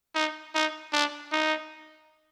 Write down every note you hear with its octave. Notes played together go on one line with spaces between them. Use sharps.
D#4
D#4
D4
D#4